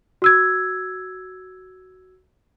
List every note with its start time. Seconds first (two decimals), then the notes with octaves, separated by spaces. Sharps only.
0.22 F#4 E6 G#6